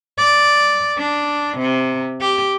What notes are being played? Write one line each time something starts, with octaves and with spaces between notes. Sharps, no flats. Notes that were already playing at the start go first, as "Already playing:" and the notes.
D5
D4
C3
G4